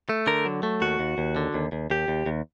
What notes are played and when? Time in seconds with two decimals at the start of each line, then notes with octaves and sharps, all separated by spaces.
0.09 A3
0.27 D3 A#4
0.45 F#3
0.63 A3
0.81 D#2 F#4
0.99 D#2
1.18 D#2
1.36 D3
1.54 D#2
1.72 D#2
1.90 D#2 G4
2.08 D#2
2.26 D#2